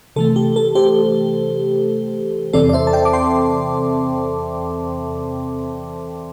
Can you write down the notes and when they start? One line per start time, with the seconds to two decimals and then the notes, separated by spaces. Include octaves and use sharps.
0.16 C3 E3 A3 A4
0.36 G4
0.56 A4
0.75 G4 C5
2.53 E2 C3 E3 C4 A4 D5
2.69 D5
2.73 C5 E5
2.87 A5
2.93 D5 G5
3.05 D6
3.13 G5 C6